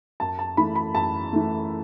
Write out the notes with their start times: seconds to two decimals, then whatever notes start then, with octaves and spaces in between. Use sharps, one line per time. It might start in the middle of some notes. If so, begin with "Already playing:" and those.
0.20 F#2 A5
0.39 A5
0.57 E3 A3 B5
0.76 B5
0.94 F#2 A5
1.33 E3 A3